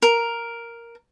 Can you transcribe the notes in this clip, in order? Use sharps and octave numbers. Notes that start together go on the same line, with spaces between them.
A#4